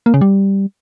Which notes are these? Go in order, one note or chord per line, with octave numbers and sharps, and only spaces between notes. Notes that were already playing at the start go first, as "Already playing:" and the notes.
A#3
C#3
G3